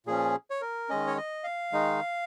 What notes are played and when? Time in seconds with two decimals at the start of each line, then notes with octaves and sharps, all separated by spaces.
0.06 A#2 F3 C#4 G#4
0.50 C#5
0.61 A#4
0.89 D#3 G#3 C#4 D#5
1.07 C#5
1.17 D#5
1.44 F5
1.72 D#3 G#3 D#4